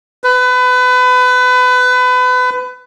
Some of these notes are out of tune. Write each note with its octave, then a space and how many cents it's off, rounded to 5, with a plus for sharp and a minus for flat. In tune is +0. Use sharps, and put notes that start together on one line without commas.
B4 +25